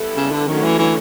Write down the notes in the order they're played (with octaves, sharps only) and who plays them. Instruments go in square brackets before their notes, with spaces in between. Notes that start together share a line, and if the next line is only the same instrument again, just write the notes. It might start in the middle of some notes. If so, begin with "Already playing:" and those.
Already playing: [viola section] G3 B3 E4 A4
[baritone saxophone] C#3
D3
[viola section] D3 F#3 A3 C#4 [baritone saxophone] D#3
[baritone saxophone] E3
E3